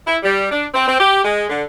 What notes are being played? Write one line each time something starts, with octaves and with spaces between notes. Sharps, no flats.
E4
G3
D4
C4
C4
G4
G#3
D3